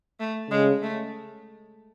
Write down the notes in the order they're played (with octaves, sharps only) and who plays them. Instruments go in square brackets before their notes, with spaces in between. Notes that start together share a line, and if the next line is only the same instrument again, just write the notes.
[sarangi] A3
[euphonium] C#3 [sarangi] G#3
[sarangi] A3